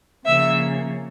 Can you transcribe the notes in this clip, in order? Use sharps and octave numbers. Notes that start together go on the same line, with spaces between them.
C#3 F3 A#3 C#4 E5